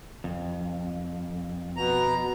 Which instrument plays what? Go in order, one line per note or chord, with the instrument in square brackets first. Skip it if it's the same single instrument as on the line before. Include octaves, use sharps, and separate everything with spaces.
[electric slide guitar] F2
[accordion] B2 A#5